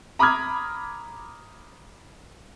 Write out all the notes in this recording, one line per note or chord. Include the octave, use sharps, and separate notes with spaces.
A#5 B5 D6 D#6 F6 G#6